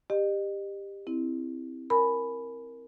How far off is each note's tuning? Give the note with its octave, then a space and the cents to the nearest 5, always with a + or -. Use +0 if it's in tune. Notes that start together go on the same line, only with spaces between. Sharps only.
G4 +15 D#5 -35
C4 +0 E4 -10
A#4 +0 G#5 +25 B5 +0